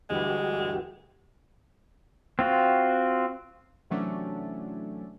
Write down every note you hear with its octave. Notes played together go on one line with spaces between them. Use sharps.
D2 G2 E3 G#3 F#4 G4
C4 F4 F#4
C3 E3 F#3 A3 C#4 D4